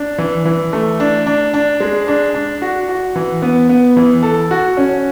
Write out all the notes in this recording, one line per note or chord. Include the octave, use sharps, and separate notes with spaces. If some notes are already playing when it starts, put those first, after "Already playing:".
Already playing: D4
E3
E3
A3
D4
D4
D4
G#3
D4
D4
F#4
F#4
E3
B3
B3
E3
A4
F#4
C#4